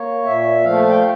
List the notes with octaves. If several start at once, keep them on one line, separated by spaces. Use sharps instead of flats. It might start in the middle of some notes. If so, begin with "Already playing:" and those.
Already playing: A#3 C#5
A#2 E5
F3 A3 F5
G5